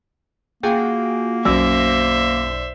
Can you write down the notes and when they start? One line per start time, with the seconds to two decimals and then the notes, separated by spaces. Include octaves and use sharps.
0.63 A#3 F4 F#4 G#4 G5
1.45 B1 F#2 C5 D5 E5 E6